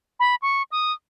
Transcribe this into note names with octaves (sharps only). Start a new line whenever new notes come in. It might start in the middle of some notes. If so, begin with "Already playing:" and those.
B5
C#6
D#6